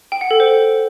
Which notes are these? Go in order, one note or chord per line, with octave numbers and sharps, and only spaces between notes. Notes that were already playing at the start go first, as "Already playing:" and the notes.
G5
F#5
A4
C5